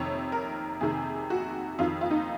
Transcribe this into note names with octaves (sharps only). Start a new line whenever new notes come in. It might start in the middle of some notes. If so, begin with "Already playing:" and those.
Already playing: F2 C3 D#3 C#5
A#4
F2 C3 D#3 G#4
F#4
F2 D#3 F4
F4
D#4